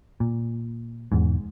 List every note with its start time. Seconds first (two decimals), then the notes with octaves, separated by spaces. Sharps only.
0.20 A#2
1.12 E1 E2 G#2